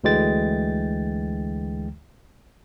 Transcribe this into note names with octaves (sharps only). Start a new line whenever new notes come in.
D2 D3 E3 G#3 G5 A6